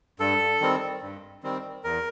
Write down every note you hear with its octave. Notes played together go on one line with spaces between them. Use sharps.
G2 A4
D#3 G3 C4
G2
D#3 G3 C4
E2 A#4